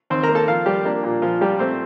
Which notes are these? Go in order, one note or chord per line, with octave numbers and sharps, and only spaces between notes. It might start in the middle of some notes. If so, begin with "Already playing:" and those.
D#2 C4 C5
A#4 A#5
A#3
A4 A5
F3 F4 F5
F3 G3 G4
A#3 D4
A#2
A#2 F3 F4
A#2 G3 G4
A3 C4 C5